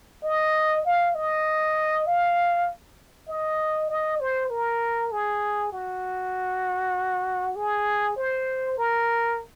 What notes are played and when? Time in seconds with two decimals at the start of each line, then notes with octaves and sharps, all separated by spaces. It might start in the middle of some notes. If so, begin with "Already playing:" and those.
0.24 D#5
0.85 F5
1.15 D#5
2.06 F5
3.28 D#5
3.90 D#5
4.20 C5
4.50 A#4
5.12 G#4
5.73 F#4
7.56 G#4
8.16 C5
8.78 A#4